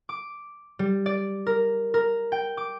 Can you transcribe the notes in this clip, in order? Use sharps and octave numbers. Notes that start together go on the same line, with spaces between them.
D6
G3
D5
A#4
A#4
G5
D6